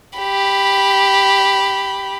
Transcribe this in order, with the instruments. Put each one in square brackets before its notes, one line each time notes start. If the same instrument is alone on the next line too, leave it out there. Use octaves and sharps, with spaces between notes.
[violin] G4 B5